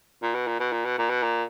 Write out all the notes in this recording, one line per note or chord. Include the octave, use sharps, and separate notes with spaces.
A#2
B2
A#2
B2
A#2
B2
A#2
B2
A#2